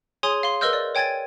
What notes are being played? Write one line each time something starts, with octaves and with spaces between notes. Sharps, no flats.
G#4 C#5 G#5 C6 D#6
F5 C6
A#4 B4 D#5 E6 F6 G6
D5
C#5 G5 G#5 G#6 A6